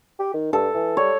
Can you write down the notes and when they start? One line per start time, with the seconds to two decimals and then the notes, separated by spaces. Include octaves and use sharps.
0.19 G4
0.34 D#3
0.53 G2 A4
0.74 E3
0.97 G3 C#5